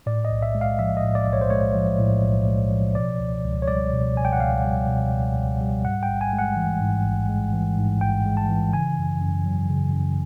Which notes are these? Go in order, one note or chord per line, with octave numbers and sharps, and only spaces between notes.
A2 D5
D#5
B1
E5
G#3
F5
F3 E5
D#5
A2
D5
B1
C#5
C5
G#3 C#5
F3
A2
B1
G#3
F3
B2 D5
C#2
C#2
C#5
G3 D5
B2
C#2 G#5
G5
F#5
C#2 F5
G3
B2
C#2
C#2
G3
G#2 F#5
G5
A1
G#5
G#3
F#5
E3
G#2
A1
G#3
E3
G#2
A1 G5
G#3
A5
E3
C#3 G#5
F#2
F#2
F#3
C#3
F#2